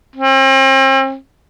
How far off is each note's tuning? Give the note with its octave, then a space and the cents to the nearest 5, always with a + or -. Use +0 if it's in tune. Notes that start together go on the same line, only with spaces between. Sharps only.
C4 +40